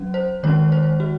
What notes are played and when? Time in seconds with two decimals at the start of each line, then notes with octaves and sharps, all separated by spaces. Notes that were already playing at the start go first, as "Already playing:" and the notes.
Already playing: F#3 C#4
0.14 C5
0.43 D#3 G#3 C#4 C#5
0.72 C5
1.00 F#4